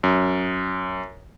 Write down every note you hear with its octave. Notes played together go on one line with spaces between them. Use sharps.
F#2